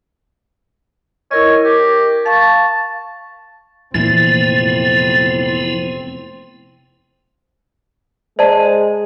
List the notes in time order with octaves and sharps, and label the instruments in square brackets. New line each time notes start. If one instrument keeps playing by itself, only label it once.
[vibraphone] E4 A#4 D#5 [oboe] C#5
[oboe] G4 [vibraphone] A#4
[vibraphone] F5 C#6 [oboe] A5
[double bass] F1 C4 [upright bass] A#2 E3 [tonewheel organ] F3 B3 E4 [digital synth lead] A6
[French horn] G#3 [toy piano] C5 D5 A5